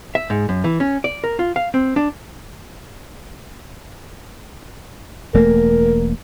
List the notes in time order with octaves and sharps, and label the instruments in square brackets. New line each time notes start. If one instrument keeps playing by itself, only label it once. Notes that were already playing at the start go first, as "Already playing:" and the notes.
[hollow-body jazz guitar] E5
G#2
F#2
E3
C#4
D5
A#4
F4
F5
C4
D4
[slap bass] E1 A3 A#3 [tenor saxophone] A#4